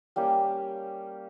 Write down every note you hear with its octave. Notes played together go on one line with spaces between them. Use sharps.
G3 A#3 C#4 G4